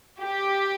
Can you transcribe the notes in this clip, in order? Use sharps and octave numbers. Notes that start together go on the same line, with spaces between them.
G4